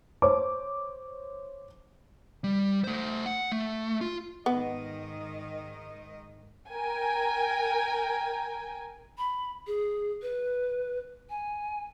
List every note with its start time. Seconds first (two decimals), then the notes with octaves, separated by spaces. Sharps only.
0.22 C5 C#5 D6
2.44 G3
2.84 A3 C5
3.26 F#5
3.52 A3
4.01 F4
4.46 G#2 D#3 B3 D#5
6.69 A#4 G5 G#5
9.18 B5
9.67 G#4
10.22 B4
11.30 G#5